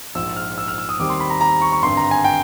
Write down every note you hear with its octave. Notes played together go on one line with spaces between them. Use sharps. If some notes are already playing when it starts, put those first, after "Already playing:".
A#1 G#2 F3 E6
F6
E6
F6
E6
D#6
D#2 D#3 G3 C4 D6
C6
B5
A#5
A#5
C#6
C#6
G#1 G2 D3 C6
A#5
G#5
G5